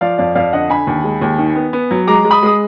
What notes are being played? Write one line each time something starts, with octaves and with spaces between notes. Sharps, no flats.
F3 D5 F5
F2 D5 F5
F2 D5 F5
D3 D#5 F#5
D3 G#5 B5
D#2
G#3
D#2
D#3
B3
B3
F#3
G#3 A#5 D6
G#3
B5 D#6
G#3 D#6